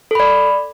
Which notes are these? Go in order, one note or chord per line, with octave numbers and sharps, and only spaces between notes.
A4 D5 B5